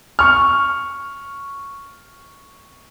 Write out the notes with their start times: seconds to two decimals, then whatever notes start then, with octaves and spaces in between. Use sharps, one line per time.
0.19 C#6 F6